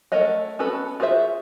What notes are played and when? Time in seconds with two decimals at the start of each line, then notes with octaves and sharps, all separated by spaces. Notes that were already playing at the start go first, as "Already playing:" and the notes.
0.12 A3 A#4 C#5 D#5 F#5
0.59 B3 C#4 F#4 A4 B4
1.00 F4 F#4 G#4 C5 E5